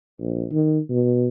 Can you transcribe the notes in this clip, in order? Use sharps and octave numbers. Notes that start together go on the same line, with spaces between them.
A#1
D#3
B2